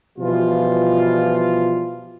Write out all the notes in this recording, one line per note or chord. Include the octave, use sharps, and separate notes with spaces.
B2 E3 F3 G3 F4